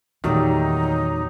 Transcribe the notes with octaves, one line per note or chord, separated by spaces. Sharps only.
E2 A#2 D#3 F#3 G3 A3 D#4 G4